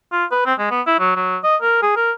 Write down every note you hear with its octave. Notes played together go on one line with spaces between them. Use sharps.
F4
B4
C4
G#3
B3
E4
F#3
F#3
D#5
A#4
G#4
A#4